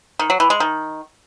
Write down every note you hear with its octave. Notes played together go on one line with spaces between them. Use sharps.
D#3
F#3
E3
G#3
D#3